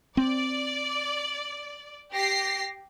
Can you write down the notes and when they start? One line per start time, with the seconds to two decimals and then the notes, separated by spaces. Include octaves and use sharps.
0.17 C4 D5
2.13 G4 A#6 C7